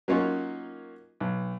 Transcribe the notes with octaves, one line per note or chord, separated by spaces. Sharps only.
F#3 A#3 C#4 D#4 F4
B1